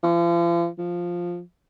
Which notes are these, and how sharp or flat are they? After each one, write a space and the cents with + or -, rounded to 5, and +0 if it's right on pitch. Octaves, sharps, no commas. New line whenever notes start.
F3 -40
F3 +5